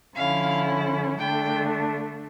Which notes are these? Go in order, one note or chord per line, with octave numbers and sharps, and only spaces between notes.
D3 F3 C#4 E4 F5
D3 A3 D4 G5